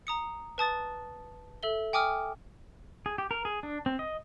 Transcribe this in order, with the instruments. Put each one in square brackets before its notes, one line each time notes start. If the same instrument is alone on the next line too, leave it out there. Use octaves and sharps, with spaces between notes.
[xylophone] A#5 D#6 C#7
B4 A5 D#6 A6
A4 E5 G7
G5 G#5 D6 D#6 F6
[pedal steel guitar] G#4
G4
A#4
G#4
D4
C4
D#5